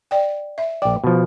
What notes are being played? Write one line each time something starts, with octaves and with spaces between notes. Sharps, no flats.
D5 G5
E5
A#1 D5 G5
B2 F3